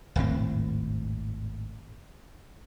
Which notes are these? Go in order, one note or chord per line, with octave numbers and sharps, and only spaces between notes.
D#1 G#1 A2 C4